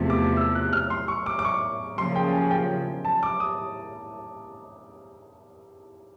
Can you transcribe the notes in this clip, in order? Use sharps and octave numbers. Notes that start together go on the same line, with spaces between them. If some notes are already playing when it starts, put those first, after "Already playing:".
Already playing: E2 C3 F3 A3
D6
E6
F#6
F6
C6
C#6
D6
D6
C#6
C#3 F3 A#3 C6
G5
G#5
G5
A5
D6
D#6